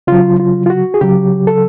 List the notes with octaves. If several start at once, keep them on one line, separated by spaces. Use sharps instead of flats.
C#3 F#3 F4
F4
F4
F#4
G#4
C#3 F#3 G4
A4